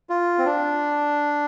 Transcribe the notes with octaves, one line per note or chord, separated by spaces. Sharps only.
F4
C4
D4